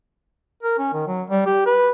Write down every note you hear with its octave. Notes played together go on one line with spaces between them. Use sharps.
A#4
C#4
D#3
F#3
G3
G4
B4